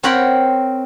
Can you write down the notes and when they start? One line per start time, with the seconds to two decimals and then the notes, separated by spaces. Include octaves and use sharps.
0.03 C4 A#4 C#5 F#5 G5 B5